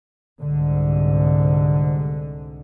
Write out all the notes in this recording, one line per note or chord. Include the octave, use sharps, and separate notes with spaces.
C2 G#2 D3